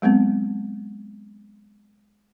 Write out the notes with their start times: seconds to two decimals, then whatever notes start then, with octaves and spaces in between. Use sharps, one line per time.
0.02 F#3 G#3 B3 C4